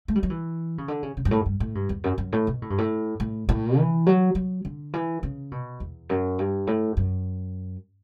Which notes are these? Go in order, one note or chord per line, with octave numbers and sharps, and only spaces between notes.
A3
G3
F#3
E3
C#3
D3
C#3
C#3
G2
A2
G2
A2
G2
E2
F#2
F#2
A2
B2
A2
G2
A2
A2
A2
E3
F#3
F#3
D3
E3
C#3
B2
E2
F#2
G2
A2
F#2